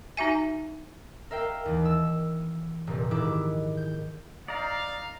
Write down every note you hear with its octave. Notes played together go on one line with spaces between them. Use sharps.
D#4 F#4 E5 G#5
A#4 E5 F5 G5
D#2 E3
E6
F1 A#2
G#2 D#3 E4 D6
G6
D#4 D5 F5 A#5